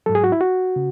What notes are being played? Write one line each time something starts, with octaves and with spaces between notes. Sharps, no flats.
G#2 F#3 A4
G#4
F#4
E4
F#4
C#3